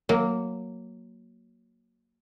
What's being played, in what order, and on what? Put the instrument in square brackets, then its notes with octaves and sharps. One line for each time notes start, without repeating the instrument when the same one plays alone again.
[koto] F#3 A#3